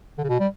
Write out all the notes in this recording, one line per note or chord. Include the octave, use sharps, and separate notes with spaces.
D3
C#3
B2
G3